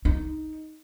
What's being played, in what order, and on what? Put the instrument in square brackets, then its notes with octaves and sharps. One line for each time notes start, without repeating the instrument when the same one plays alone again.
[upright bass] D#4